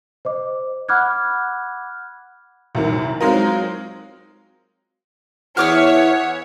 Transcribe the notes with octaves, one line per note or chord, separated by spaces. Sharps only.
C5 D#5 D6
F#5 B5 D6 F6 F#6 G#6
C2 F#2 D#3
F#3 G#3 C4 D#4 F4 A#4
E2 E4 G#4 C#5 E5 F#5 D6 F6